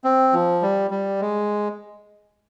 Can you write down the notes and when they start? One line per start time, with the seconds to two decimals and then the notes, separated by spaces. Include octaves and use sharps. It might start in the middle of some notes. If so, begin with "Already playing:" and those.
0.04 C4
0.33 F3
0.62 G3
0.91 G3
1.21 G#3